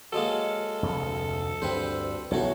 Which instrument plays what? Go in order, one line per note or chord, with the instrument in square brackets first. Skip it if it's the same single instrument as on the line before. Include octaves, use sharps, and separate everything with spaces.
[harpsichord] F#3 G#3 A#3 [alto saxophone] A4
[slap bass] F1 D2
[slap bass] D2 G2 [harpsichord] C4 B4 C5
[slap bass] B1 [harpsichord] A2 A3 F#4 [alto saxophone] C#5